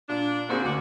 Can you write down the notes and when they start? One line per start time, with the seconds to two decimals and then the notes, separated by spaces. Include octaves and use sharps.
0.09 A#2 D4
0.49 D3 A#3 C4 F#4 G#4
0.64 D2 F#4 D6